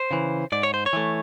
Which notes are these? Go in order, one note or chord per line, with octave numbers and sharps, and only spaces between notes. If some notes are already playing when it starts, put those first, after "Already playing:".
Already playing: C5
C#3 E3
G#2 D5
C#5
C5
C#5
E3 A3